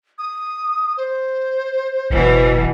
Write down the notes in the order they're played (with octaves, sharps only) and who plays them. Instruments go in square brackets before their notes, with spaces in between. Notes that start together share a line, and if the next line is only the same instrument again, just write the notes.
[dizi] D#6
C5
[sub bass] F#1 [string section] B2 E3